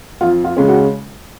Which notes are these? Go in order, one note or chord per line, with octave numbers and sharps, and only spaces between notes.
F2 F4
F4
C#3 G#3 C#4
F#4